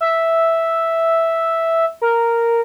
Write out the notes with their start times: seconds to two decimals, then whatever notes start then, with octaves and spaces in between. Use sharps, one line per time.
0.01 E5
2.02 A#4